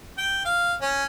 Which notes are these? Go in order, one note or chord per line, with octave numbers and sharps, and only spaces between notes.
G5
F5
C#4